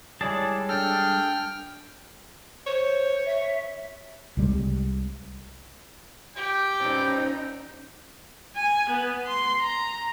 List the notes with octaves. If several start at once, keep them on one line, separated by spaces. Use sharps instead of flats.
G3 G#3 E4 G#4 C#5 D5 A5
D4 A4 G5 F6
C5 C#5
E5
C2 C3 G3 G#3
G4 G5
G2 A#2 C4 C#4 D#4
G#5
B3
C6
A#5